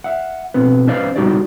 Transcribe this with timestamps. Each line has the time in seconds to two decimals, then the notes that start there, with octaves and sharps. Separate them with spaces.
0.04 E5 F#5
0.54 B1 C4 B4
0.87 C#4 B4 C5 D5 D#5 F5
1.16 C#2 G3 D#4 F#4 G4 D5